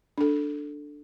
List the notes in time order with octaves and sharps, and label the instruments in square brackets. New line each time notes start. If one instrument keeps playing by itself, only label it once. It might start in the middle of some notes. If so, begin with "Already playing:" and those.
[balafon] D4 A4